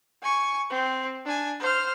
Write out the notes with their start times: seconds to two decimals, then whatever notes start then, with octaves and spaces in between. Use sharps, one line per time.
0.23 G#5 C#6
0.70 C4
1.26 D4 G#5
1.60 C5 F6